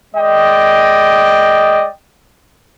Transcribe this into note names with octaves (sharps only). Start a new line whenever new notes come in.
G#3 D5 D#5 G5